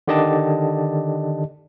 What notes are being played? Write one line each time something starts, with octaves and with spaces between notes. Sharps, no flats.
D3 D#3 G4 D5 D#5 A5